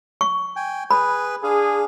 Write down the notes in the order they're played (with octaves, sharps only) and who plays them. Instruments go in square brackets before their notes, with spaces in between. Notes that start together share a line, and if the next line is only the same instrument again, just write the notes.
[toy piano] C#6
[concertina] G5 G#5
[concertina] G#4 B4 [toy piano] B5
[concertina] D4 F5 [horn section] G#4